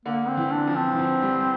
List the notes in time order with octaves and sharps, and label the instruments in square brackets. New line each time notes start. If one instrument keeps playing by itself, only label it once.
[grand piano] D3 [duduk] A#3
[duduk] C4
[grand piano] E3
[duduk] D4
[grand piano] F3
[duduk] C4
[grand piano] E3
F3
G3